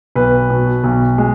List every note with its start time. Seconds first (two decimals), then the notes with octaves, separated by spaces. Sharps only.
0.16 B1 B4
0.50 B2
0.84 B1
1.18 G#3